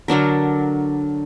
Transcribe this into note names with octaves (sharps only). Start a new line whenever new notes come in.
D3 F#3 D4 A#4